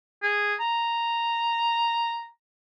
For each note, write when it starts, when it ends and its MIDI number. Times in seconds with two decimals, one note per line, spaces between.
0.23 0.55 68
0.60 2.27 82